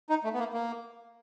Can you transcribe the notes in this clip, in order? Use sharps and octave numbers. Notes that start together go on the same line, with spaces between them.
D#4
A3
B3
A#3
A#3